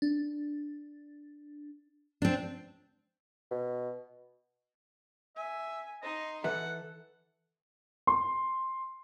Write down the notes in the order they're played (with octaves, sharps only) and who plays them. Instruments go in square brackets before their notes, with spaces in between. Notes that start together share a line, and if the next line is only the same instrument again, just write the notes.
[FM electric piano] D4
[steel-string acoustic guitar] C4 D4
[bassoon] B2
[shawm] E5 [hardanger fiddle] G#5
[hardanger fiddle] D#4 C6 [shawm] D#5
[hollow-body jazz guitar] E3 B4 E5 [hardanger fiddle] A4 [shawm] F#5
[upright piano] C6